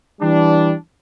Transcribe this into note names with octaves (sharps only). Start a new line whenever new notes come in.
E3 G3 D4